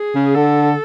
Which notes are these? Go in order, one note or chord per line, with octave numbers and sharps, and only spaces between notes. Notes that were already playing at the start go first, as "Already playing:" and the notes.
Already playing: G#4
C#3
D3 A4